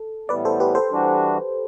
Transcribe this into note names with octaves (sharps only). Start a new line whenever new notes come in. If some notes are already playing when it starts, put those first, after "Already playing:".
Already playing: A4
A2 E3 G3 B3 B4 D5
A4 C5
G4 B4
A4 C5
E3 G3 D4 F#4